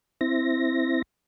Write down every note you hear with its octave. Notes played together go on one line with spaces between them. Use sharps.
C4 E4 A#6